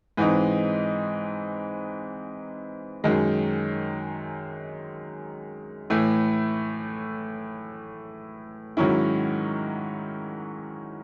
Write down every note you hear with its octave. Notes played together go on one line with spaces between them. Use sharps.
G#2 E3 C4 D#4
F#2 D#3 G#3
A2 E3 A3
G#2 D#3 F#3 C#4 E4